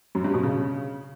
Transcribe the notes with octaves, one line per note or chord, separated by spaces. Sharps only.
F#2
G2
B2
C#3